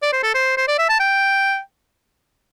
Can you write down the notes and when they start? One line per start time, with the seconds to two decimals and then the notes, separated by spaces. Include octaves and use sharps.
0.03 D5
0.13 C5
0.23 A4
0.34 C5
0.57 C5
0.68 D5
0.79 E5
0.89 A5
1.00 G5